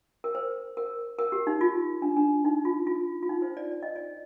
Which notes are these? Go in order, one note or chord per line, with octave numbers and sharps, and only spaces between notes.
A#4
C5
A#4
A#4
G4
D#4
F4
D4
D4
D#4
F4
F4
F4
D#4
C5
D5
D5
D#5
D5